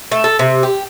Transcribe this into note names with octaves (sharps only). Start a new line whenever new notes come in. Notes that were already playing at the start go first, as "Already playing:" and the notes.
A3
A4
C3
G4